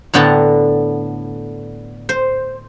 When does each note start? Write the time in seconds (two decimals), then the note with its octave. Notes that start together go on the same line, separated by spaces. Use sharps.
0.14 A2 D3 B3 G5 A5 A#5
2.09 C5